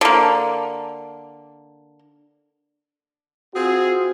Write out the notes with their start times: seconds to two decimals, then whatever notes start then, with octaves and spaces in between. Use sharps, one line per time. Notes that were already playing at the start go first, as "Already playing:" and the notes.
0.01 D3 A#3
3.54 C4 F4 F#4 G#4